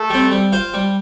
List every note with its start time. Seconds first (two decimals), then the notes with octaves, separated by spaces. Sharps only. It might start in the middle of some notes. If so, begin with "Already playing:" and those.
Already playing: A3 A4
0.10 G3 C4
0.31 G3
0.53 F4 C5
0.74 G3